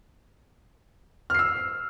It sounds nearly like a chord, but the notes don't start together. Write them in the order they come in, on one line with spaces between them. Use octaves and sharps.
F6 C7 E6